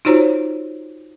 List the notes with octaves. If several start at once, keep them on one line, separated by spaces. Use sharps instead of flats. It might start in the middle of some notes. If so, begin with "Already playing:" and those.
D#4 F4 F#4 C5 C#5 A#5